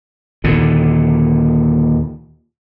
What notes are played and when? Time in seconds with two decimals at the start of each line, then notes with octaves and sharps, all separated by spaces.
0.44 D#2 A#2 D3